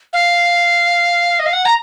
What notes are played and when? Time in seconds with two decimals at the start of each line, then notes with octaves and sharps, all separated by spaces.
0.13 F5
1.39 D#5
1.46 F5
1.53 F#5
1.65 A#5